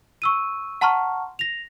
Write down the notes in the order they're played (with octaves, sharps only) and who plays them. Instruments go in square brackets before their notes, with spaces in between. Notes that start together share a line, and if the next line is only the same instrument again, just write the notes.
[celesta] C#6 E6 D#7
F#5 A5 A#5 C6 C#6 F6
A#6 F7